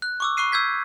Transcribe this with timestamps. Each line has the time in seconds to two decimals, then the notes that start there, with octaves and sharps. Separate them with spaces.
0.02 F#6
0.20 C#6 D6 E6
0.37 B5 C#6 D6 F#6 C7 D#7
0.52 E6 G6 G#6 B6